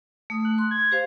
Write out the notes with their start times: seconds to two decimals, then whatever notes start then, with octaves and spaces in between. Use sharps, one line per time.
0.30 A3 D#6
0.45 F#6
0.58 C6
0.71 G#6
0.92 G4 C5 F5